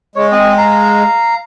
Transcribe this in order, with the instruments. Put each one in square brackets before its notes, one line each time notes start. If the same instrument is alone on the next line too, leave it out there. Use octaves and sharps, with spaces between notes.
[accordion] G#3 [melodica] C#5
[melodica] C4 D#5
F5 A#5